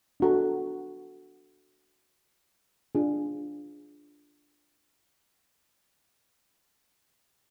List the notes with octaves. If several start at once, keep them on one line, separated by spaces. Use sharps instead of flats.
D4 F#4 A4
D4 F4 G#4